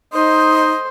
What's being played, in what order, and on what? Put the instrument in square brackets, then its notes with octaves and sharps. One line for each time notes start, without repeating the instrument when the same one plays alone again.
[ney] D#4 [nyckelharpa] C5 [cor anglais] D#5